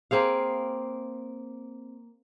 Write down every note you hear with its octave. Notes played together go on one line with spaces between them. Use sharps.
A#3 C4 G#4 F5